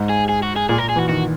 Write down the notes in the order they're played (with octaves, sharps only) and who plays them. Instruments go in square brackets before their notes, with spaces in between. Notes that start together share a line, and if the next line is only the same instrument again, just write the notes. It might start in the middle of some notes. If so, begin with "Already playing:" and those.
Already playing: [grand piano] G#2
[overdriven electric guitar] G#4
G#4
F#4
G#4
[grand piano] A#2 [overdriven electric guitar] G#4
[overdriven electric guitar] A#4
G#4
[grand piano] E3
[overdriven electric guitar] F#4
[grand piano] D#3 [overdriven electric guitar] F#4